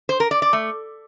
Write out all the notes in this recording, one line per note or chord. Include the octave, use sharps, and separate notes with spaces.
C5
A#4
D5
D5
A3